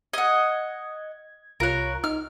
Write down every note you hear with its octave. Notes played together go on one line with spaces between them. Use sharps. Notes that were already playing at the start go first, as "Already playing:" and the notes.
D#5 F#5 G#6
C2 F4 A#4 C#5 F#6
D#4 F6